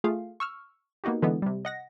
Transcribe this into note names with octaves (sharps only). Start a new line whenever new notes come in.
A3 F4 G#4 F5
C#6 E6 F6
A#3 B3 D#4 F#4 G4
D3 E3 G#3 B3
C3 G3
D#5 F#5 A#6